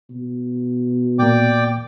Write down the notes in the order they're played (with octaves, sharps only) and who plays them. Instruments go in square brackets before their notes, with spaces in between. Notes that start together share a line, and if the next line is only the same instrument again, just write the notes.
[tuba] B2
[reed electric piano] A#2 A#3 [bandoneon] D5 G5 D6